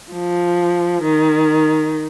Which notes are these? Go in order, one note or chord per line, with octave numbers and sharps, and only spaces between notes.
F3
D#3